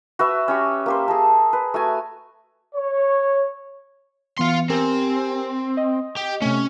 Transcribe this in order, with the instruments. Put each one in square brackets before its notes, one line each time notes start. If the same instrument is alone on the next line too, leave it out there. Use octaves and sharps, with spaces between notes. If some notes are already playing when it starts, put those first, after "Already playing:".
[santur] F#4 B4 E5
C#4 G4 C#6
A#3 G4 C5
G#4 A#4 A5
B4
A3 F#4 G#5
[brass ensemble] C#5
[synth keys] E3 B3 C#7 [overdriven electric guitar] F5 C6
[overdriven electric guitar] C4 [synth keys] G4 A#4 G#5
[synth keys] D#5
[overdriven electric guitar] G4
[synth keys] C3 A3 [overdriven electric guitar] C#4